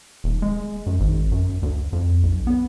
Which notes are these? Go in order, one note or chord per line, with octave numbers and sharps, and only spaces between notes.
D#1
G#3
F#2
G#1
F#2
D2
F2
B1
B3